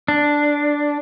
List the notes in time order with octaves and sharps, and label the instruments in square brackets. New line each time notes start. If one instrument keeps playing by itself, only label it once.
[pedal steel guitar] D4